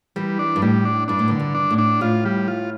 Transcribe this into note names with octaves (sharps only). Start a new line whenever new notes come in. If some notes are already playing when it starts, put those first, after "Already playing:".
E3 G3
D4
G2
A2 G3
D4
G2 D4
A2
G2
D3
G2
D4
A2
D4
A2 F4
G3
F4